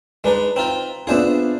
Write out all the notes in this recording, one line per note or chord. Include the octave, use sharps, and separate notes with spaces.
G#3 D4 D#4 B4
C4 D#4 F4
B3 D4 F4 G#4 C5 E5